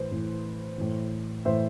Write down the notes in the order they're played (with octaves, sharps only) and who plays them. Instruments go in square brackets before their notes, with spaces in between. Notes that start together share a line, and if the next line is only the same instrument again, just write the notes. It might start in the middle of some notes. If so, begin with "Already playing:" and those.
Already playing: [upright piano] A2 E3 B4 C5
A2 E3
A2 E3
A2 E3 C5 E5